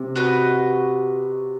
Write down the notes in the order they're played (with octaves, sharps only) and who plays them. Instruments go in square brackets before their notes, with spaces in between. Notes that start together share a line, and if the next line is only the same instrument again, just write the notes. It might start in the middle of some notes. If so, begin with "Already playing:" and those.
Already playing: [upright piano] C3
[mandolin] F#4 B4 D#5